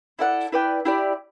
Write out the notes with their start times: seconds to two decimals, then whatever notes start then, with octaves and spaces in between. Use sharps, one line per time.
0.19 E4 A4 D5 F#5
0.52 E4 B4 D5 G5
0.85 E4 G4 D5